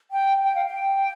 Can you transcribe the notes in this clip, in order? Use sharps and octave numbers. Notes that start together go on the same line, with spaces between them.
G5
G5
F5
G5